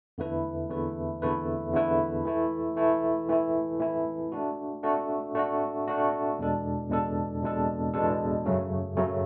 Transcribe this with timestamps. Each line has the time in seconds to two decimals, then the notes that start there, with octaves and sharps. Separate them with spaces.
0.18 E2 D3 A3 E4 B4
0.69 E2 D3 A3 E4 B4
1.22 E2 D3 A3 E4 B4
1.74 E2 D3 A3 E4 B4
2.25 E3 A3 E4
2.76 E3 A3 E4
3.29 E3 A3 E4
3.80 E3 A3 E4
4.32 A3 D4 F#4
4.83 A3 D4 F#4
5.35 A3 D4 F#4
5.88 A3 D4 F#4
6.39 E2 B2 G#3 D4 A4
6.90 E2 B2 G#3 D4 A4
7.43 E2 B2 G#3 D4 A4
7.94 E2 B2 G#3 D4 A4
8.46 F#2 C#3 F#3 A3 C#4
8.97 F#2 C#3 F#3 A3 C#4